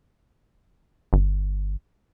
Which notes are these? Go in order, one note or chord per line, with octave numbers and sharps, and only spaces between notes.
G1